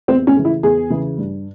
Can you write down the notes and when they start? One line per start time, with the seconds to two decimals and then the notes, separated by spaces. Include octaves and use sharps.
0.08 E2 C4
0.27 C#4
0.37 C#3 E3
0.45 E4
0.63 E2 G#4
0.90 C#3 E3
1.18 G2